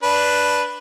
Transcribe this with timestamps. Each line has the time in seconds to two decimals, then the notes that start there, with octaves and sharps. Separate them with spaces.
0.03 D4 B4